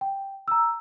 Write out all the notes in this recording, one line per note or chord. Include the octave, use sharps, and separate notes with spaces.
G5
A#5 E6